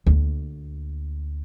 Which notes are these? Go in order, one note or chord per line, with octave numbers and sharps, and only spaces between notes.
D2 A#3